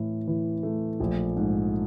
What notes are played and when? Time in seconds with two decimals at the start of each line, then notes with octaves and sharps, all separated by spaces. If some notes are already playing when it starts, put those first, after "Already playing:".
Already playing: A2 E3
0.27 E3
0.63 A3
1.00 A#1
1.37 G#2